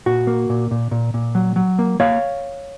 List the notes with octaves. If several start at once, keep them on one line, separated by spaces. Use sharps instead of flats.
A#2 F#4
A#3
A#2
A#2
A#2
A#2
F#3
F#3
A#3
A#3 C#5 F5